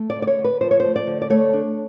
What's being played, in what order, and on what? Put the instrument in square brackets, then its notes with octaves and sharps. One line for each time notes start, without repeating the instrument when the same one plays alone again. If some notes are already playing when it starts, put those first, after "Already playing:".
Already playing: [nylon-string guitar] A3
D5
D3
D5
C#5
D3
B4
F3 C5
C#5
A3 C5
D5
D3
D5
A3 C#5
D4